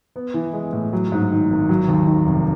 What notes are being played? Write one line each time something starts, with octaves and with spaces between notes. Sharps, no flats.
B3
E3
G#3
A2
F#3
G#2
D#3
G#1
F#3
D#2
D#3
F1